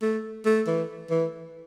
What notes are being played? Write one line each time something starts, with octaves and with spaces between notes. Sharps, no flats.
A3
A3
E3
E3